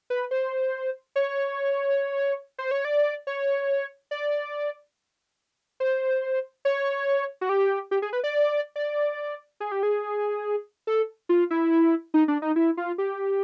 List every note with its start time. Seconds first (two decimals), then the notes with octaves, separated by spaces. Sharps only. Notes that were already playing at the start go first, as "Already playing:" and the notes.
0.10 B4
0.31 C5
1.16 C#5
2.58 C5
2.71 C#5
2.85 D5
3.27 C#5
4.11 D5
5.80 C5
6.65 C#5
7.41 F#4
7.49 G4
7.91 G4
8.02 G#4
8.13 B4
8.24 D5
8.76 D5
9.60 G#4
9.72 G4
9.83 G#4
10.87 A4
11.29 F4
11.50 E4
12.14 D#4
12.28 D4
12.42 D#4
12.56 E4
12.77 F4
12.98 G4